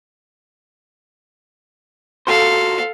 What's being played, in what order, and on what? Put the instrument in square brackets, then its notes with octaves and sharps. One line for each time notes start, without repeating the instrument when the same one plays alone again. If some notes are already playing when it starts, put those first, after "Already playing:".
[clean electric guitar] A#2 F#4 C5 [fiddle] A4 F5